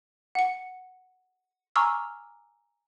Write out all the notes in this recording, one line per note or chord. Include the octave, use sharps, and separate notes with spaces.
F#5 C#7
G#5 A#5 C#6 D6 E6 F6